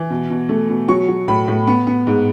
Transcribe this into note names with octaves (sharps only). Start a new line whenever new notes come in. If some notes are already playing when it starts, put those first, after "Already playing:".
Already playing: E3
B2
B2
A3
B2
F#3 C#6
F#3
A2 B5
A2
B3
B3
G#2